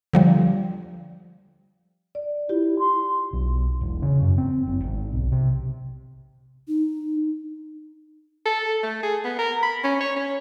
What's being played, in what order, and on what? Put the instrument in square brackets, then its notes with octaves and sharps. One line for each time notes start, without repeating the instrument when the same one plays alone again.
[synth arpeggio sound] D3 F3 G3
[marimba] D5
[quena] E4 [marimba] F4 G4
[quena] C6
[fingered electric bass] B1
E1
C#3
F#2
C4
F#1
G#1
B1
C3
[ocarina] D#4
[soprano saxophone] A4
A3
G#4
B3
A#4
B5
C#4
C#5
C#4